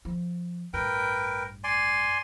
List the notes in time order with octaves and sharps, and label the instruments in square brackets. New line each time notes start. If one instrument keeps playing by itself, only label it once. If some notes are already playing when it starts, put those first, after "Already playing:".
[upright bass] F3
[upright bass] A1 G2 [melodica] A#4 B4 G5
[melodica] D5 G#5 C6